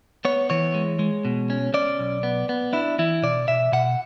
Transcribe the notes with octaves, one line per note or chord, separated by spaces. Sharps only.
B3 C#5
E3 C#5
G#3
G#3
B2
C#4
C#4 D5
B1
B3
B3
D4 E4
E3 E4
B2 D5
B2 E5
B2 F#5